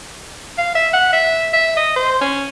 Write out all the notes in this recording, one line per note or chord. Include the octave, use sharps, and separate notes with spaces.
F5
E5
F#5
E5
E5
D#5
C5
C#4